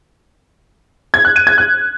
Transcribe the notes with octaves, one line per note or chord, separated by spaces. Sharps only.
G#6
F#6
D#7
G#6
F#6